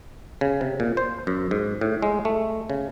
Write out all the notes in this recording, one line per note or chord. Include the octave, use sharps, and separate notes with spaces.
C#3
C3
A#2
C5
F#2
G#2
A2
G#3
A3
C#3